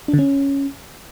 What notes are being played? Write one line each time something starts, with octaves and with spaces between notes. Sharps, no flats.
D4
D3
C#4